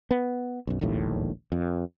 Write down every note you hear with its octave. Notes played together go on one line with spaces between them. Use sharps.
B3
B1 F#2
E1 A#1 D#2 A2
F2